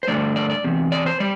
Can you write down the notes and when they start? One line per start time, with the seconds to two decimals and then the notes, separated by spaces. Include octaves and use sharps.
0.03 C5
0.07 G2 D3 F3 A3 D5
0.36 D5
0.50 D5
0.64 E2 C3
0.92 D5
1.06 C5
1.20 G3 D5